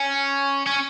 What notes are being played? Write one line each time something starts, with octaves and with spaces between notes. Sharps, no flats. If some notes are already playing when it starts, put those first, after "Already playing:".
Already playing: C#4
C#4